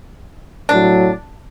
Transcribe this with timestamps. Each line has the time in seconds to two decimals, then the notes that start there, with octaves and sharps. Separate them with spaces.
0.69 A2 F#3 D4